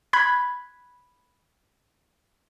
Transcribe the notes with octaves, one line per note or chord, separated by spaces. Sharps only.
B5 F#6 G#6 B6